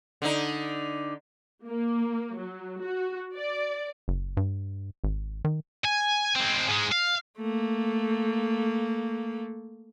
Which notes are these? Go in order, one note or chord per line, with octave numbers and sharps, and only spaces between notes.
D3 D#4
A#3
F#3
F#4
D5
F#1
G2
G#1
D#3
G#5
G#3 C4
G#2 G#3
F5
A3 A#3